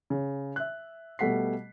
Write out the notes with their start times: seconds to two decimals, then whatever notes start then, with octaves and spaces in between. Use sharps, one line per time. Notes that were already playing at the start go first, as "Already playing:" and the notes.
0.10 C#3
0.56 E5 F#6
1.19 B2 G3 A3 F#5 B6 C7